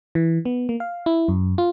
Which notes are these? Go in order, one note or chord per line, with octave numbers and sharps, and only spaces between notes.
E3
B3
A#3
F5
E4
F#2
F4